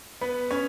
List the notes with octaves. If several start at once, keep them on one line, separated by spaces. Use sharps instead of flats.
B3 B4
C#4 C#5